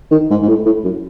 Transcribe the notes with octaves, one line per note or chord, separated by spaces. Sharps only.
D#3
G#2
G#2
A2
A2
F#2